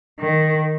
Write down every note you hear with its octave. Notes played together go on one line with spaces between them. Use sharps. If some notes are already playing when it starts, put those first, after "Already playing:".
D#3